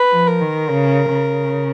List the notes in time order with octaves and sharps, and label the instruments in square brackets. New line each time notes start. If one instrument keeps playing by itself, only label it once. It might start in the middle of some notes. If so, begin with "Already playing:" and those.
Already playing: [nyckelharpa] B4
[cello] F3
[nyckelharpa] A#4
[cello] D#3
C#3
C#3